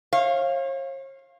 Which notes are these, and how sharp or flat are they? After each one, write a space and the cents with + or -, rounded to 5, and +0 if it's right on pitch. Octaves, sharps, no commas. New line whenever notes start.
C#5 -45 F5 +0